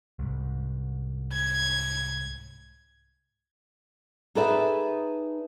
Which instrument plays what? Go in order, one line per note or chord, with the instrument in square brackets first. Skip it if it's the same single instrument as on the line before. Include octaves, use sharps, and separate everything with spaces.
[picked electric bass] C2 G#2
[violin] G#6
[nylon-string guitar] D#4 G#4 A4 B4 D5 E5